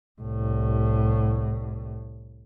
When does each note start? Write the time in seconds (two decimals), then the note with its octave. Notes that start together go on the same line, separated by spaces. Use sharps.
0.21 C2 A2